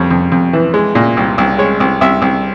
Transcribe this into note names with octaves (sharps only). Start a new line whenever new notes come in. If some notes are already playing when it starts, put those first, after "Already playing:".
Already playing: F2 G3 C#5
F2
F2
E3
G#3
A#2
C2
C2
G#3 C#5
C2
C2 E5
C2